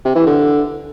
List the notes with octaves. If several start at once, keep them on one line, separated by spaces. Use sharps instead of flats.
C3
E3
D3